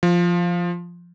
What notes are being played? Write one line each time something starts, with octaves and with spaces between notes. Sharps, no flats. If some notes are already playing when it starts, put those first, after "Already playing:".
F3